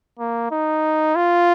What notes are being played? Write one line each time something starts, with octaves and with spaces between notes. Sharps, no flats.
A#3
D#4
F4